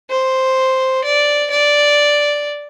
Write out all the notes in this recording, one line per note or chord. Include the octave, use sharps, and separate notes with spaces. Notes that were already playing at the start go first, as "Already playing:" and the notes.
C5
D5
D5